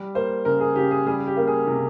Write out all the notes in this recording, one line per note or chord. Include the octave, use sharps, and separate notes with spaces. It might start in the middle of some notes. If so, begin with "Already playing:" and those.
Already playing: G3
A#3 C5
C#3 A#4
G#4
C#3 G4
G#4
G3 G#4
G4
A#3
G#4
C3